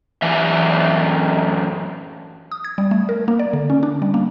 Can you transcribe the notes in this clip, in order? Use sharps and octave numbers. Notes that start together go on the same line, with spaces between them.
F#2 E3 E5
D#6
G#6
G3
A3
A#4
A#3
D5
D3
C#4
D4
G3
A#3